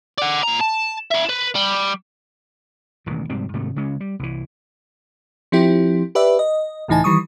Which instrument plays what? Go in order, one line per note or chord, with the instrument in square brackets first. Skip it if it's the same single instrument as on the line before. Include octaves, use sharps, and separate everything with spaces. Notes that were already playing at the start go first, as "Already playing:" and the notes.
[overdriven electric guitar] D5 F#5
A#2 A#5
A5
F4 E5
B4
G3
[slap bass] E1 A1 D#3 E3
F1 G#2 G3 C4
G#2 C3 D#3 A3
C#3 G#3 C#4
G3
C2 E3
[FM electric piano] F3 C4 E4 G4
G4 B4 D5 E5
D#5
C#2 A2 E3 D#4 G#5 A5
D#3 E3 G3 C#6 D#6